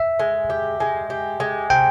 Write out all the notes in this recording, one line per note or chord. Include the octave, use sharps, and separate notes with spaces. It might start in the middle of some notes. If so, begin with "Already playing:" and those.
Already playing: E5
G#3
G4
G#3
G4
G#3
C3 G5